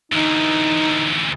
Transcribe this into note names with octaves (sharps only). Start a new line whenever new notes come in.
D2 E3 D#4